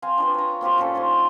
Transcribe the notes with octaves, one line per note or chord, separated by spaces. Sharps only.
C4 C5 F5 G#5
D4 F4 B4
C#5 A#5
A#3 C4 F4 G4
A#2 C#4 F4 A4
D#4 C5 G#5 C6